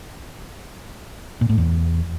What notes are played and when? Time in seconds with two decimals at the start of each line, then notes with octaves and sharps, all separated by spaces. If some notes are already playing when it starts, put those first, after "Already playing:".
1.41 A#2
1.49 A2
1.58 E2